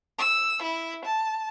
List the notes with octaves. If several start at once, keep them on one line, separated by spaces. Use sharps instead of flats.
E6
E4
A5